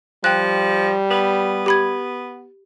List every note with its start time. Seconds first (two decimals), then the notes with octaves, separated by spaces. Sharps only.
0.24 F3 G3 G5 F#6
1.10 B3
1.66 G4 B5 G#6